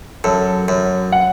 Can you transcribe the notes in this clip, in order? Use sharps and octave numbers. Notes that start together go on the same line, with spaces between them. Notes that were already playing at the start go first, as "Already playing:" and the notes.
F#2 A4
F#2
F#5